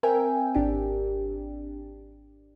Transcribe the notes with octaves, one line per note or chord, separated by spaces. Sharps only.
C4 A#4 E5 G5 G#5
G#1 D4 G4